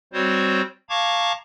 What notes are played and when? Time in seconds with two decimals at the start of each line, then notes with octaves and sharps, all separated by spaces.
0.13 G3 C4 F#4 C5 C#5
0.89 F5 A5 A#5 C#6 D6 G#6